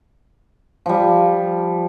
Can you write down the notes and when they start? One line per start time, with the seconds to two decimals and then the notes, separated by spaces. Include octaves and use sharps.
0.86 F3 G3